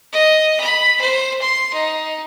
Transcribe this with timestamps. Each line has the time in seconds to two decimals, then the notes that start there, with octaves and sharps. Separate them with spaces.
0.13 D#5
0.60 B5
1.01 C5
1.42 C6
1.73 D#4